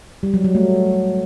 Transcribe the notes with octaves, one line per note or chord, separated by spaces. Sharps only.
G3
F#3
F#3
A3